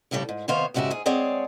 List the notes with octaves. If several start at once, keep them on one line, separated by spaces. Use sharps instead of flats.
D2 A2 C#3 G3 A4 D5
G#2
C3 D#3 B3 C5 C#5 F5
D2 G#2 C#3 F#4 G4 E5
G#2 G#4
G#3 C4 G#4 C#5 D5 F#5